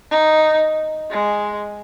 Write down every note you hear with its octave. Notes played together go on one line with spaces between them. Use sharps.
D#4
G#3